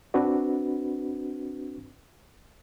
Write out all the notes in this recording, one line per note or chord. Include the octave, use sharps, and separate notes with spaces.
C4 D4 F#4 B4